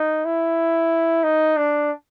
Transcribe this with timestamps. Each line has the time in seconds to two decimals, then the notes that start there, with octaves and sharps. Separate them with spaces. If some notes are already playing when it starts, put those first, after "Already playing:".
Already playing: D#4
0.25 E4
1.23 D#4
1.57 D4